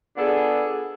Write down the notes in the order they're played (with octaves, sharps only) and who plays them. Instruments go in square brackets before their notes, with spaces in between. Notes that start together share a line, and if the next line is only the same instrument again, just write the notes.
[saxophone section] B3 D4 F4 G#4 A4